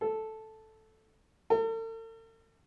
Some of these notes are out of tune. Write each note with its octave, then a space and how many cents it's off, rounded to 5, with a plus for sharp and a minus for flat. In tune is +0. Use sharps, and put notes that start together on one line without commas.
A4 -5
A4 +45